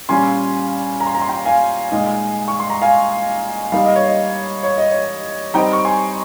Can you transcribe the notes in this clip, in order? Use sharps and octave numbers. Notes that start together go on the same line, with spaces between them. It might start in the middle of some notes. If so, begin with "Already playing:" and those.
A#2 G3 C#4 F4 G#5 C6
A#5
C6
A#5
C6
G5 A#5
F5 G#5
A#2 G#3 D#4
C#6
C6
A#5
F5 G#5
G3 A#3 D#4 F5
D#5
C#5
D#5
C#5
D#5
C#5
G3 C4 D#4 G5 A#5
C#6
G#5 C6